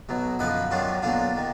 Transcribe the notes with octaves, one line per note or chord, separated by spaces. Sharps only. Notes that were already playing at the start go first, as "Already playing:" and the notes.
B1 B2 F#3
F#2 D3 F3 B4 D#5
F#2 D#3 F#3 D4 F4
B1 A#2 F#3 D4 F4
D#3